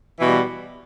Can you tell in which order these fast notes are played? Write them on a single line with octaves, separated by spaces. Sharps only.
E3 B2 G3